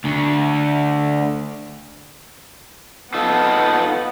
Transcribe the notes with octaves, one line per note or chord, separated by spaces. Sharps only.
D2 D3
B3 D#4 F4 A4